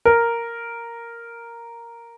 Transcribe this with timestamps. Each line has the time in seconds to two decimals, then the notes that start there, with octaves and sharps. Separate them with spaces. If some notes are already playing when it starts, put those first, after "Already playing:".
0.05 A#4